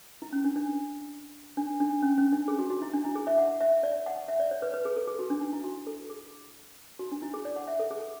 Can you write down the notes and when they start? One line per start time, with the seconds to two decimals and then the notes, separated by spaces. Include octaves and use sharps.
0.22 E4
0.33 C#4
0.45 D4
0.56 D4
1.57 D4
1.80 D4
2.02 C#4
2.18 C#4
2.32 D4
2.48 G#4
2.59 F#4
2.70 F#4
2.82 E4
2.93 D4
3.05 E4
3.15 G#4
3.27 E5
3.38 F#5
3.61 E5
3.83 D5
4.06 F#5
4.28 E5
4.40 D5
4.51 C#5
4.62 B4
4.74 B4
4.85 G#4
4.96 A4
5.07 G#4
5.19 F#4
5.30 D4
5.41 D4
5.53 E4
5.64 F#4
5.87 A4
6.10 G#4
6.99 F#4
7.12 D4
7.22 E4
7.34 G#4
7.45 D5
7.56 F#5
7.67 E5
7.79 A4
7.91 G#4